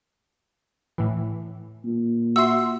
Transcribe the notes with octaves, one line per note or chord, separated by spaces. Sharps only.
A2 E3
A#2
F#4 E5 C6 E6